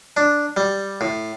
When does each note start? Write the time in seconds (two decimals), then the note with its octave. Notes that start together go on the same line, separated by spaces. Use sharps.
0.17 D4
0.57 G3
1.01 A2